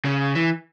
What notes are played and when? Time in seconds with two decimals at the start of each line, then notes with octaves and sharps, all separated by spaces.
0.05 C#3
0.35 E3